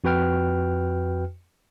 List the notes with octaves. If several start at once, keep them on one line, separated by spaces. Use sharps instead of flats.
F2 F#4 B4 G5 F6